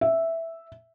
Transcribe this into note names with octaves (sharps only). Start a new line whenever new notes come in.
E5